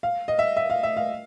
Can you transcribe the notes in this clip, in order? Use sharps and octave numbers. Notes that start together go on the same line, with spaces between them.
F5
D#5
E5
E5
F5
E5
F5